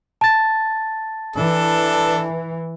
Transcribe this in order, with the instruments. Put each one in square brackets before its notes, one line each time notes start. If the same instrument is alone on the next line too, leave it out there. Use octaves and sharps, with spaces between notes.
[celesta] A5 A6
[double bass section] E3 [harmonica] D4 A4